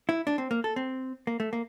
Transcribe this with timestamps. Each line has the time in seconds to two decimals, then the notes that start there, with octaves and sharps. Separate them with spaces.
0.09 E4
0.27 D4
0.38 C4
0.51 A#3
0.64 A4
0.76 C4
1.27 A#3
1.40 A3
1.53 A#3